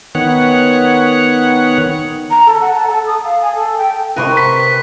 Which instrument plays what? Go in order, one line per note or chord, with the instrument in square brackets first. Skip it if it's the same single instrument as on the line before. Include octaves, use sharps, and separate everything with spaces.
[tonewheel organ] D#3 B3 C#5 F#5
[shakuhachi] A#5
A4
F#5
A5
A4
D#6
F5
G#5
A4
G5
[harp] C3 D#4 A#4 [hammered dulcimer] B4 C6 C#6
[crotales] B6